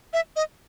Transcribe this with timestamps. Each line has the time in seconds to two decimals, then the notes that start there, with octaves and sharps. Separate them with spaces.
0.13 E5
0.36 D#5